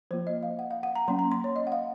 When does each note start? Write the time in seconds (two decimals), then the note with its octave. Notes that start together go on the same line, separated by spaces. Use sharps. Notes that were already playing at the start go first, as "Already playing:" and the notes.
0.11 F3 A#3 F4 C5
0.27 D#5
0.43 F5
0.59 F#5
0.71 F5
0.83 F#5
0.95 A#5
1.08 F#3 A#3 C#4 C6
1.19 A#5
1.32 C6
1.44 C#5
1.56 D#5
1.67 F#5
1.72 F5